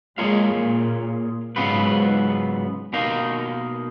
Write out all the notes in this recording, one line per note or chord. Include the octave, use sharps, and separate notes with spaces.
G#3 A#3 F4 G#4 C#5 F5
A#2
G#2 C#3 F#3 B3 F4 B4
B2 A#3 D#4 A#4 F5